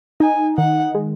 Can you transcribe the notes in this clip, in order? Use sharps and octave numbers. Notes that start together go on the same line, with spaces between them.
D#4 G#5
D#3 F#5
G#3